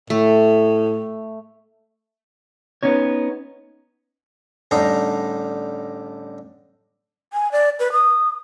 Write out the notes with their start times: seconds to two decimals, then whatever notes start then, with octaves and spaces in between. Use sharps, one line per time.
0.10 A2 A3
2.83 B3 C#4 D#4 C#5
4.71 A1 D3 G3 D#4 F5 A#5
7.33 G#5
7.52 D5
7.80 B4
7.92 D#6